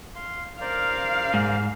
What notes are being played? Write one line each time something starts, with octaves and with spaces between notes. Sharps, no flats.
F5 C6
A#4 C5 D5 F5
G#2